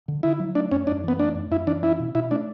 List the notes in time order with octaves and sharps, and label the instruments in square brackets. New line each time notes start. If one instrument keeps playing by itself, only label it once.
[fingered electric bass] D3
[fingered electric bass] D3 [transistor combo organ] E4
[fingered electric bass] F#3
[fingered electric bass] A3 [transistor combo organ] D4
[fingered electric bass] F#2 [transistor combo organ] C#4
[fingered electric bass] F#2 [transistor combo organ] D4
[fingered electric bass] E3 [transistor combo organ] B3
[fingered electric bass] A3 [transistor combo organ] D4
[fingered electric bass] F#2
[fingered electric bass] F#2 [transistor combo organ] E4
[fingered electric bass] E3 [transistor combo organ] D4
[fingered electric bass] C#4 [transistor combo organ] E4
[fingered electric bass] B2
[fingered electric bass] B2 [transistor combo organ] E4
[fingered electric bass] A3 [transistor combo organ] D4